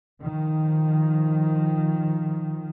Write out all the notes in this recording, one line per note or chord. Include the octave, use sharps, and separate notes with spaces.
D#3 F3